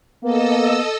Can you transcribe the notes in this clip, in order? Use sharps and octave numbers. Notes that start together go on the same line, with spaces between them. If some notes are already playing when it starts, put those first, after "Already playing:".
A#3 B3 A4 D#5 E6